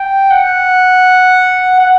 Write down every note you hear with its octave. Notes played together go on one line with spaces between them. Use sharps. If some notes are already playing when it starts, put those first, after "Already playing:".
Already playing: G5
F#5
F#5